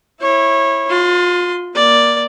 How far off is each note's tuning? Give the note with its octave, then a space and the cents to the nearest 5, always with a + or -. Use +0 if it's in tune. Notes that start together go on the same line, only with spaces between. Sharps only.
E4 +0 C#5 -25
F4 +30 C6 -10
A#3 +15 D5 +0